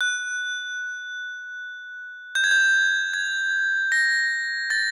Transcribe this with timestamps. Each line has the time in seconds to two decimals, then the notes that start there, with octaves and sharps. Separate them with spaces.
0.01 F#6
2.35 G6
2.44 G#6
2.51 G6
3.14 G#6
3.92 A#6
4.70 A6